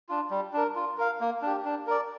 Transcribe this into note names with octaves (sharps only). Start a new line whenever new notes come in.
D4 F4
G3
D4 A#4
F4
A#4 F5
A#3
D4 G4
D4
A#4 D5